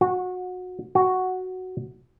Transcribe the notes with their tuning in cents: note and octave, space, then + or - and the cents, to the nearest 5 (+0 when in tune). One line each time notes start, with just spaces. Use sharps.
F#4 -25
F#4 +0